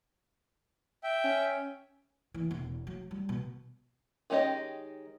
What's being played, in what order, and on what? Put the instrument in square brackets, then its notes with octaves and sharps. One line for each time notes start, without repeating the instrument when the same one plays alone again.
[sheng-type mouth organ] E5 G5
[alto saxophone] C#4
[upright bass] E3
E1
F#3
G3
B2
[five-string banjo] D#3 G#3 C#4 G4 D#5